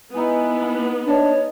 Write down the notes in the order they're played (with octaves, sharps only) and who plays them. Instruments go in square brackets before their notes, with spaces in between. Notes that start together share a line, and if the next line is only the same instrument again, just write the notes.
[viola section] B3 [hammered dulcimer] D#4 G#4 [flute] E4
[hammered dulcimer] A5 B5
[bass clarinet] D4 [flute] C#5 [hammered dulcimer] D#5 F5 A5